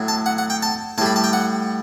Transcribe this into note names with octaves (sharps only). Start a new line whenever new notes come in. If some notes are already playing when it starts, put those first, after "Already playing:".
Already playing: A2 F#3
A5
F#5
F#5
G5
A5
A2 G3 A5 B5
A5
G5
F#5